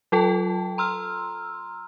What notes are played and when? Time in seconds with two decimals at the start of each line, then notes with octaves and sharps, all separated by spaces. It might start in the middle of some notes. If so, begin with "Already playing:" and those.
0.12 F#3 F4 A4 G5 A5
0.78 A#5 C6 E6 F6